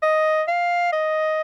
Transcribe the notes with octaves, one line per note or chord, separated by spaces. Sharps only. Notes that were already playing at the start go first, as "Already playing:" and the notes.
D#5
F5
D#5